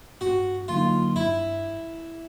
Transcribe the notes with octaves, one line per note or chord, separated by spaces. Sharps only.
G2 F#4
D3 F#3 A#3 D#4 F4
G2 E4